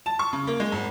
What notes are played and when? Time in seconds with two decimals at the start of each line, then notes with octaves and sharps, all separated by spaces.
0.06 A5
0.19 C#6
0.33 C#3
0.47 A#3
0.60 G#3
0.72 G#1